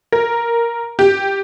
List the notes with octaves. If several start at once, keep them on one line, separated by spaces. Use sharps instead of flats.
A#4
G4